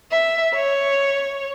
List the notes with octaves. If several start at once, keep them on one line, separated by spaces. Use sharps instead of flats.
E5
C#5